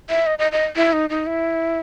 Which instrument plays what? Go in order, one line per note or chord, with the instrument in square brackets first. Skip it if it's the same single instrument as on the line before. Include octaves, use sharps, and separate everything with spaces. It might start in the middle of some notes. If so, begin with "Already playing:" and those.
[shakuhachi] E5
D#5
D#5
D#5
E4
D#4
D#4
E4